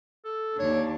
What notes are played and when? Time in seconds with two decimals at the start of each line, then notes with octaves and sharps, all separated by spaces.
0.25 A4
0.59 D#2 D4 C#5